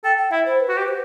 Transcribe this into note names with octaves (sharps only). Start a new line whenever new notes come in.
A4 G5
G5
E4 E5
C5
B4
F#4
G4
C5